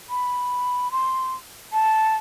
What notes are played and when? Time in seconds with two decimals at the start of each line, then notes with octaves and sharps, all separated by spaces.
0.10 B5
0.92 C6
1.73 A5